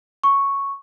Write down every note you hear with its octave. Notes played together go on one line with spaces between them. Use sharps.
C#6